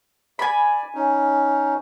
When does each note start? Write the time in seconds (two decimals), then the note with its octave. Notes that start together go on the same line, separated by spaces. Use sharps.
0.39 D5 G#5 B5
0.94 C#4 D#4